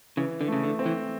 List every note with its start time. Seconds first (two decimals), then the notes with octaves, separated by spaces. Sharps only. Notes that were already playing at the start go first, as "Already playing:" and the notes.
0.17 C#3 E3
0.41 D3
0.48 C#3 A3
0.63 D3
0.79 C4
0.86 E3